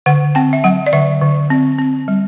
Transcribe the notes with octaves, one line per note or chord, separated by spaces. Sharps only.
D3 F#5
C4 G5
E5
F#3 F#5
D5
D3 E5
D3
C4
C4
G3